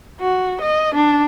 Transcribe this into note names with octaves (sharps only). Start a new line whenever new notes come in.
F#4
D#5
D4